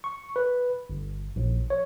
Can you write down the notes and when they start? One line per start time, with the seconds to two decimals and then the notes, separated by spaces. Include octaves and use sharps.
0.04 C#6
0.36 B4
0.90 G1
1.36 A#1
1.70 C#5